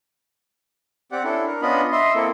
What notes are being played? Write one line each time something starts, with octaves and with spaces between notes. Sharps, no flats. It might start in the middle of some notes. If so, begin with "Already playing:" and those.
C4 G4 D5 F#5
C#4 D4 E4 A4
D4 A#4
B3 C#4 D4 F4 D#5 B5
D#5 E5 C6
A#3 C4 E4 A4